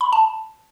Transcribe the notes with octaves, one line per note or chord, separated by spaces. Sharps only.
B5
A5